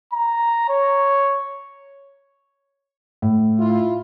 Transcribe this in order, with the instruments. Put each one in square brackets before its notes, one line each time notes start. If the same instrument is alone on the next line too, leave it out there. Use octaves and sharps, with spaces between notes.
[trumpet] A#5
C#5
[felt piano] A2
[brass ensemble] E4 F4